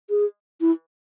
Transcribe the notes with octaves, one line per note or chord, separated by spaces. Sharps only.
G#4
E4